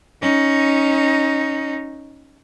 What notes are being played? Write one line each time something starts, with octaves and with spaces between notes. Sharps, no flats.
C#4 D#4